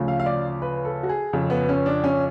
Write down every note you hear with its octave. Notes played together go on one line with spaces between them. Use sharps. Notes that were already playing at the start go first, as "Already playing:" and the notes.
Already playing: D2 C#3 F3
F5
F5
D5
B4
A4
F#4
G#4
F2 C#3 F3
B3
C#4
D4
C#4